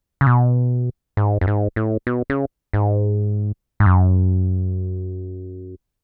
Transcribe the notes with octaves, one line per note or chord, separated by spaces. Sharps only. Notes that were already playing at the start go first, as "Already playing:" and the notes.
C#3
B2
G#2
F#2
G#2
A2
B2
C#3
G#2
G#2
F#2